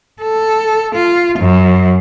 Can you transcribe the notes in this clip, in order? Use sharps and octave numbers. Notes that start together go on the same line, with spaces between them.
A4
F4
F#2